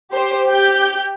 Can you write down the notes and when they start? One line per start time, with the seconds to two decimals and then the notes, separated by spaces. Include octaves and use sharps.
0.13 G4 C5
0.48 G4 G6